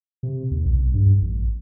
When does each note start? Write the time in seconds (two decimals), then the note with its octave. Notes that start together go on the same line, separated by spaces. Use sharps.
0.23 C3
0.51 D#2
0.66 B1
0.94 G2
1.22 A1